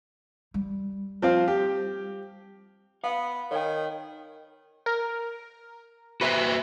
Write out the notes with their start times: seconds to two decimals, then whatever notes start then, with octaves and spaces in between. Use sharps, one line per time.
0.54 G3
1.22 F3 C4 F5
1.48 G4
3.04 B3 F5
3.51 D#3 C#5 G5
4.86 A#4
6.21 F#4 B4 C5 E5 B6